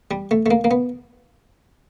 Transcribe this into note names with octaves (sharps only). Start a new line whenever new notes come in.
G3
A3
A3
A#3
A#3
B3